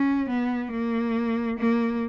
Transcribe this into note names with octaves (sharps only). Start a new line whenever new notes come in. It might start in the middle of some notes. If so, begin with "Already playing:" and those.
Already playing: C#4
B3
A#3
A#3